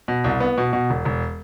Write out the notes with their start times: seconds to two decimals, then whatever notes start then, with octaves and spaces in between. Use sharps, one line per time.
0.08 B2
0.24 C2
0.40 B3
0.58 B2
0.73 B2
0.90 E1
1.05 E1